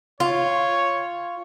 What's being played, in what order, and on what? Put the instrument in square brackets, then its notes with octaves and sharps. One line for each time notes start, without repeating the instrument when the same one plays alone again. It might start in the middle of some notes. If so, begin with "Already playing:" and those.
[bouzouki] F4 [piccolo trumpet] C#5